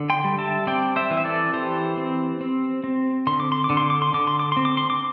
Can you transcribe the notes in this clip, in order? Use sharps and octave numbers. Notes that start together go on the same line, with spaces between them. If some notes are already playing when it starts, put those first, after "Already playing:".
Already playing: D3
G5 C6
G3
E5 A5
C4 D5 G5
C5 E5
E3
E5
A4 D5
E3 G4 C5
C4
C4
C4
D3 C6
D6
C6
D6
D3
C6
D6
C6
D3 D6
C6
D6
C4 C6
D6
C6
D6